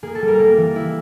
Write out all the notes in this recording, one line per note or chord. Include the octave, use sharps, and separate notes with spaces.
A#3 G#4
A4
G3
A#4
A#3
E3
E4